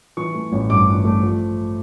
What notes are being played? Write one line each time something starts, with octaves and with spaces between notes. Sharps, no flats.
E3 C#6
A3
A1
G2 D6
E3
A3
F3